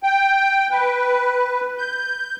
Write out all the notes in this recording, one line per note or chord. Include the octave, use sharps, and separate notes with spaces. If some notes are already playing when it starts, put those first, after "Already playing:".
G5
B4
G6